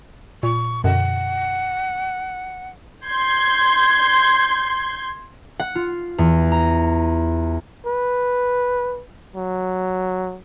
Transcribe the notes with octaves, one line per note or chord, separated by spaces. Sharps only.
A#2 C#6
F#2 B2 D3 F#5
C6 G6 G#6
F#5
F4
E2
A#5
B4
F#3